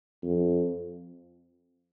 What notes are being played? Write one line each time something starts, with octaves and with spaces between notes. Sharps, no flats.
F2